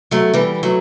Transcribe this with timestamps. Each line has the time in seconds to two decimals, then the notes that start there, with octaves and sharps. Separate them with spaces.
0.11 F#3 A3
0.34 E3 G3
0.63 F#3 A3